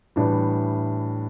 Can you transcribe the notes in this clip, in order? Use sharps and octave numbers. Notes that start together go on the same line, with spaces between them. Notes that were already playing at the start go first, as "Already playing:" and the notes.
A2 E3 G3 D4